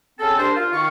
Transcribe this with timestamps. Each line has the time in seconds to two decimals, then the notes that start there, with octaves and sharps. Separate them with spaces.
0.19 C#3 C4 C#4 A4
0.37 G3 D4 A#4 C5
0.55 F4
0.72 D#3 F5 C#6